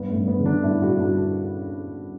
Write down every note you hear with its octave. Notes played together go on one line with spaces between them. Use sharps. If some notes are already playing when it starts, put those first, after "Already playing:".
Already playing: G2 B3
A3
G2
B3
D3
D4
G2 E4
F#4
G2
D4